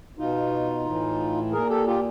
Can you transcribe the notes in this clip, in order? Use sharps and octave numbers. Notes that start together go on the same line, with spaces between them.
B2 D#4 F4
A2 E3
A#2 G#4 A#4
G4 A4
F4 G4